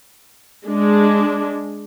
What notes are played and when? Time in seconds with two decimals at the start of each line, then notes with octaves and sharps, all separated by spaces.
0.67 G#3 D4